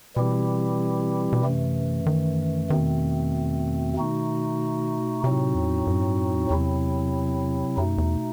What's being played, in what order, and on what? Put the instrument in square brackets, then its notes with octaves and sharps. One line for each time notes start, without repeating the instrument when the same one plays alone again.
[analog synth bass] B2 [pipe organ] E3 G3 C4 E4 G4
[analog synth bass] B2
[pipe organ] F#2 E3 A3 [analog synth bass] C3
[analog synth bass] D#3
[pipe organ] E2 B2 A3 C4 [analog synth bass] D#3
[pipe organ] B2 A3 D#4 F#4
[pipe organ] A2 F#3 C4 D#4 F#4 [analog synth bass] C3
[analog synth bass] E2
F#2
G2
F#2
E2
[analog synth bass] E2 [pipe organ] C3 F#3 C4 E4
[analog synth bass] F#2 [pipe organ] B2 A3 D#4
[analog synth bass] E2